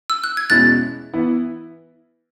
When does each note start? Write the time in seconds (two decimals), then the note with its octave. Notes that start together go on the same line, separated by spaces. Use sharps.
0.10 E6
0.24 F#6
0.37 G#6
0.50 E2 B2 G#3 C#4 E4 F#6 A6
1.13 E3 B3 E4